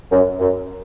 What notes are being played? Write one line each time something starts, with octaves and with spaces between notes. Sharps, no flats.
F#2
F#2